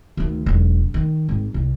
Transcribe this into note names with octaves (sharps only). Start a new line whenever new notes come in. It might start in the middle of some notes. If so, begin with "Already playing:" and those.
D2 D#3
E1 F#3
D#3
G#1
C2